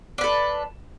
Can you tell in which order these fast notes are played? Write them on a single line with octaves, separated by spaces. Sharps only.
D4 B4 A4